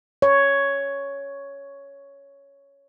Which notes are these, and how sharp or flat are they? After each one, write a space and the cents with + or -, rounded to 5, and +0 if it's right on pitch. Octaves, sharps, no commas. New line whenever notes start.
C#5 +5